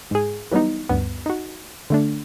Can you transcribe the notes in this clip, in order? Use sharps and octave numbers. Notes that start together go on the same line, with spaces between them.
G#2 G#4
E3 F#3 G3 B3 D#4
D2 G2 B3
D#4 F#4
D3 A3 D4